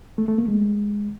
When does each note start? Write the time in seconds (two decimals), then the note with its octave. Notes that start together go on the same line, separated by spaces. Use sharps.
0.18 A3
0.28 A3
0.38 A#3
0.48 G#3